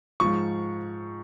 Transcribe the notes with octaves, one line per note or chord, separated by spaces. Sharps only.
G#2 F3 C#6